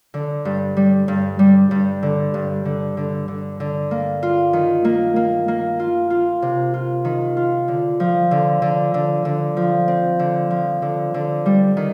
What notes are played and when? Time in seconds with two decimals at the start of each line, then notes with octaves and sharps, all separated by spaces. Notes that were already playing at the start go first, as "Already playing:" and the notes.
0.14 D3
0.45 G2
0.77 G3
1.08 G2
1.39 G3
1.71 G2
2.03 D3
2.34 G2
2.65 D3
2.97 D3
3.28 D3
3.60 D3
3.91 A#3
4.23 F4
4.53 D#3
4.85 A#3
5.16 A#3
5.48 A#3
5.80 F4
6.10 F4
6.42 C3
6.74 F4
7.05 D#3
7.37 F4
7.68 D3
8.00 F3
8.31 D3
8.62 D3
8.94 D3
9.25 D3
9.57 F3
9.88 C4
10.19 D3
10.50 F3
10.82 D3
11.14 D3
11.46 G3
11.77 D#3